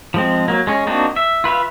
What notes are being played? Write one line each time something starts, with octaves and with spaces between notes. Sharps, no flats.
F3 G#3 C4
F#3 A#3
G#3 C#4
A#3 C4 D4 D#4 F#4
E5
F4 B4 E5 F5